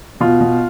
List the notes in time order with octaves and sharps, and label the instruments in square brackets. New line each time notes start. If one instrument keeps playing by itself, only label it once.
[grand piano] B2 F4
B2